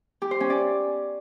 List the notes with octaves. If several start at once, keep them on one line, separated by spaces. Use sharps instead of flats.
G4
C5
C#4
D5